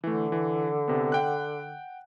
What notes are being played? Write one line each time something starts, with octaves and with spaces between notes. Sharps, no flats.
D3 E3 A3
E3
C3 B3
F#5 G5 F#6